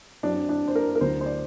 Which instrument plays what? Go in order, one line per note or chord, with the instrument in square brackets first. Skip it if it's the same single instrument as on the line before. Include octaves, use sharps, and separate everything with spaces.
[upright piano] F#2 F#3 C4 D4
D4
C5
A#4
A#4
D2 D3 F#3 C5
C5
D5